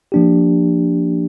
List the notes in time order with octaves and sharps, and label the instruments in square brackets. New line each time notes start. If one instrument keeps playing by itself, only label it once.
[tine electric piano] F3 A#3 D4 G4